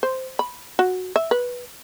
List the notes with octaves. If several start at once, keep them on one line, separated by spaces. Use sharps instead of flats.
C5
B5
F#4
E5
B4